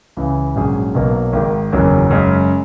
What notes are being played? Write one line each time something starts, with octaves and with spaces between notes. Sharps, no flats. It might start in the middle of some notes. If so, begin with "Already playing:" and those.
C#2 C#3 E3
A#1 G#2 F#3 C#4 G#4
B1 B2 F#3 A#3
G#1 G#2 D#3
F#1 E2 D#3 F#3 C#4
F#2 C#3 G#3 C#4